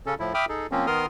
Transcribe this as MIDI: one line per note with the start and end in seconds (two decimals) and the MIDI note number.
0.06 0.14 49
0.06 0.14 61
0.06 0.14 69
0.20 0.33 45
0.20 0.33 53
0.20 0.33 64
0.34 0.45 76
0.34 0.45 79
0.34 0.45 83
0.34 0.45 86
0.34 0.45 87
0.34 0.45 89
0.49 0.67 63
0.49 0.67 68
0.49 0.67 69
0.72 0.87 53
0.72 0.87 58
0.72 0.87 60
0.72 0.87 61
0.87 1.06 51
0.87 1.06 59
0.87 1.06 70
0.87 1.06 84
0.87 1.06 87
0.87 1.06 89